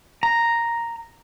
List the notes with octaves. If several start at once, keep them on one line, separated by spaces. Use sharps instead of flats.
A#5